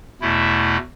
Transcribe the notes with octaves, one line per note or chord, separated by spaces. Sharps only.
E2 B2 A3 E4